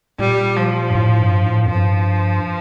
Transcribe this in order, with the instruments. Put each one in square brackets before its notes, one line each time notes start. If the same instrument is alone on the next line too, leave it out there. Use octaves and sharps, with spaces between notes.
[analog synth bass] A#2 [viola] G3
[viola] F3
[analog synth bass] G2
A2
G2
A2
F2
[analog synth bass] G2 [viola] F3